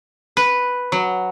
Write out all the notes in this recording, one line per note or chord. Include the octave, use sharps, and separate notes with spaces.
B4
F#3